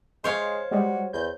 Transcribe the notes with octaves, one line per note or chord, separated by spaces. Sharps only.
G#3 C5 C#5 F5
G3 G#3 F#4
E2 G6